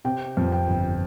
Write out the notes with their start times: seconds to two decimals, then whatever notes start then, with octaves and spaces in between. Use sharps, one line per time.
0.05 C3 G5
0.37 F2
0.52 G5
0.68 G1